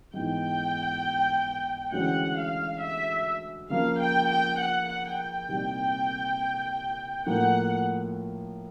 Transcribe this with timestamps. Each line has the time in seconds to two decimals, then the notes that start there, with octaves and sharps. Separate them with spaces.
0.14 G#2 E3 G#3 B3 E4 G5
1.92 D2 C#3 E3 G#3 C#4 F#5
2.37 F5
2.81 E5
3.70 C#3 F3 A#3 F5
4.00 G5
4.29 G5
4.59 F#5
4.89 F#5
5.18 G5
5.49 C2 A#2 G3 C4 D#4
7.26 A2 F3 A#3 F#5